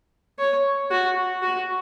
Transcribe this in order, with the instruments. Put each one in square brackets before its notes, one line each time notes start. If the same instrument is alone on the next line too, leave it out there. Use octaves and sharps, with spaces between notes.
[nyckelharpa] C#5
F#4
F#4